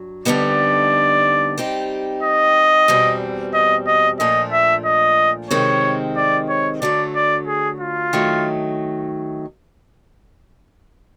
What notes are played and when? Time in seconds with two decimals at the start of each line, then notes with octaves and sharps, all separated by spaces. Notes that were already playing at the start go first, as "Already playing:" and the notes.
Already playing: G2 F#3
0.25 F2 D3 G3 B3 D#4 D5
1.58 G3 C4 D#4 G4
2.23 D#5
2.88 E2 B2 G3 C4
3.54 D#5
3.87 D#5
4.20 A#2 F3 A3 D4 D#5
4.53 E5
4.86 D#5
5.51 C3 D#3 G#3 C4 C#5
6.17 D5
6.49 C#5
6.82 D3 F#3 A3 D5
7.15 D5
7.47 G#4
7.81 F4
8.13 D#3 F#3 A3